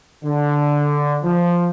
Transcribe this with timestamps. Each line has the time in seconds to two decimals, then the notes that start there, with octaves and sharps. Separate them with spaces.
0.24 D3
1.23 F3